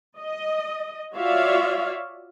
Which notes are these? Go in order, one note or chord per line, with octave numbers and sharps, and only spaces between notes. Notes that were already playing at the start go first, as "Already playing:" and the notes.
D#5
F4 F#4 C#5 D5 E5 F5